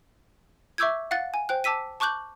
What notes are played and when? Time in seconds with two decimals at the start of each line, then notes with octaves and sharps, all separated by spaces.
0.78 E5 C#6 D6 E6 G6 G#6
1.11 F5 F#5 F#6 A6
1.34 G#5
1.49 C5 G5 F#6
1.64 A5 D6 E6 B6 D#7
2.00 A5 C#6 D6 F#6 G6 F#7